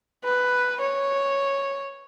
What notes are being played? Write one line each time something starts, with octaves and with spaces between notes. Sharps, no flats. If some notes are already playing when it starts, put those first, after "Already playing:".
B4
C#5